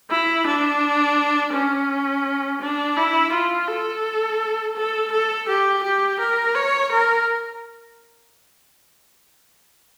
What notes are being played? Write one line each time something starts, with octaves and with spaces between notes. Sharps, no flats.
E4
D4
C#4
D4
E4
F4
A4
A4
A4
G4
G4
A#4
C#5
A#4